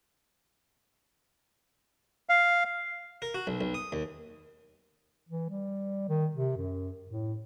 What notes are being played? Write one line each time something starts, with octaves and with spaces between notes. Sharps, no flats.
F5
A#4
F#4
B1
B1
D#6
D#2
E3
G3
D#3
C3
F#2
A2